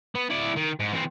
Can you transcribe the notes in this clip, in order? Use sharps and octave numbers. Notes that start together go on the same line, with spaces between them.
B3
E4 D5
D#3
G#2
E3 C4